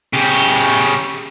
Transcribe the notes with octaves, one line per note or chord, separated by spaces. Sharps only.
C#3 G4